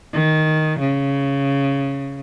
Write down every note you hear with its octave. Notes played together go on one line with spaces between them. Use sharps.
D#3
C#3